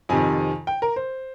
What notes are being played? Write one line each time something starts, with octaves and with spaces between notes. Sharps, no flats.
F2 C3 D#3 G#5
G5
A#4
C5